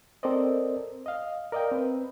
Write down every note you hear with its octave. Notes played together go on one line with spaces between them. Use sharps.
C4 A4 A#4 C5 D5 D#5
D#5 F5
A#4 D5 D#5 F5 G5
C4 B4